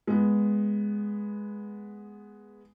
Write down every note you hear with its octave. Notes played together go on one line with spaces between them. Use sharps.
G#3 B3